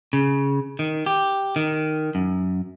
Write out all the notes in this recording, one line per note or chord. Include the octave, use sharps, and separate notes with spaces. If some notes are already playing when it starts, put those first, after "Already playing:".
C#3
D#3
G4
D#3
F#2